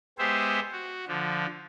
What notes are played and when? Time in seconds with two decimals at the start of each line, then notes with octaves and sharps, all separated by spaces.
0.19 G#3 B3 G4 G#4 C5 E5
0.72 F#4
1.08 D3 F3